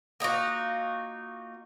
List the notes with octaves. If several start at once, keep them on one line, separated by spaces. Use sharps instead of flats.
A#3 D#4 F4 F#4